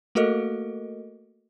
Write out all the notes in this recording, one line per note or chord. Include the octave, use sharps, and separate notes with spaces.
A3 A#3 F#4 A4 A#4 D#5